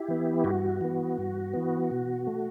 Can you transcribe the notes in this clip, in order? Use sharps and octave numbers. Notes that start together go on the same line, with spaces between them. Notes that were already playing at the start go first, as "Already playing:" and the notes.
Already playing: E4 G4
E3 B3
G2 F#4
E3 B3
G2
E3 B3
B2
A3